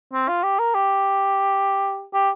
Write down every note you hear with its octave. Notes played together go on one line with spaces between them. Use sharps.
C4
F4
G4
A#4
G4
G4